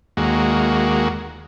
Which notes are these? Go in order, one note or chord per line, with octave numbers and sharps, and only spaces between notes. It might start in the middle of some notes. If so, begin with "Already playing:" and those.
D#2 G#3 A#3 F#4